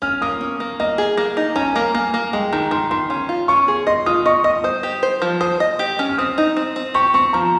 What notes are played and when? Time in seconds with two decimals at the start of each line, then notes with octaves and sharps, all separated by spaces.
0.02 C#4 F6
0.22 A#3 D#6
0.41 C#4
0.60 A#3
0.80 A#3 D#5
0.98 G#4
1.17 A#3
1.37 D#4
1.56 C#4 A#5
1.63 G#5
1.70 A#5
1.76 A#3
1.94 A#3 G#5
2.14 A#3
2.33 G#3 G5
2.53 D#3 A#5
2.71 D#3 C6
2.91 D#3 C6
3.10 C#4 C6
3.29 F4
3.48 C#4 C#6
3.68 G#4
3.87 D#5 C6
4.06 F4 D#6
4.26 D#5 C#6
4.44 D#5 D#6
4.64 C5 D#6
4.83 G4
5.03 C5
5.22 F3
5.41 C5 D#6
5.60 D#5
5.79 G4
5.99 C#4
6.09 F6
6.18 C4 D#6
6.38 D#4
6.57 C4
6.76 C4
6.94 G4 C#6
7.14 C4 C#6
7.33 F3 A#5